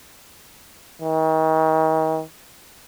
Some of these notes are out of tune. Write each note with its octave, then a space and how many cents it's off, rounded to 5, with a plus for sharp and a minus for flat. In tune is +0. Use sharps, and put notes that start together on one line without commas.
D#3 +35